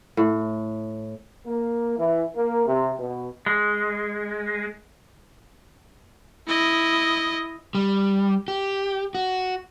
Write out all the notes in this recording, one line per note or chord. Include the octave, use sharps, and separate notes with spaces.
A2
A#3
E3
A#3
C3
B2
G#3
E4 D#5
G3
G4
F#4